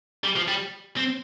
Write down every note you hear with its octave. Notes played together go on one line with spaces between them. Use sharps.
G3
F3
G3
C4